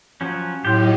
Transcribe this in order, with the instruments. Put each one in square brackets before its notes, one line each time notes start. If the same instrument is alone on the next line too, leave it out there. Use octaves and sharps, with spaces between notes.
[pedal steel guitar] F3 F#3 C#4
[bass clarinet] A2 [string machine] F#3 D#4 [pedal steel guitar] F4 G4